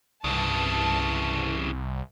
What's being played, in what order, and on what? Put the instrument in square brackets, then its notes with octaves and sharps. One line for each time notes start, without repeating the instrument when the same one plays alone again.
[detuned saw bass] C2 [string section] G2 A5 [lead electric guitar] C#3 E3